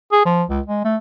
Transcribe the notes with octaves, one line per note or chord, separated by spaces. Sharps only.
G#4
F3
C#2
G#3
A3